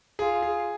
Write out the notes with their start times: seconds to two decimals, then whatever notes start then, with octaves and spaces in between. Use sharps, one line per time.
0.19 F4 G#4
0.42 G#4